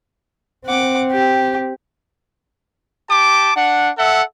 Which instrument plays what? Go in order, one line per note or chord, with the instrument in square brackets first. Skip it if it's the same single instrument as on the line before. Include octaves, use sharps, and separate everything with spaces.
[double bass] C4 [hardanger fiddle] F#5 D6
[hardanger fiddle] G4
[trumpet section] G4 A5 D6
D4 F#5
A4 E5 F#5